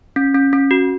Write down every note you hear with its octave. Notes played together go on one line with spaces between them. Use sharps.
C#4
C#4
C#4
F#4